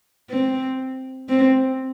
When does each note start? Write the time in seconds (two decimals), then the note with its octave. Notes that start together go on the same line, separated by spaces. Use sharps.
0.30 C4
1.29 C4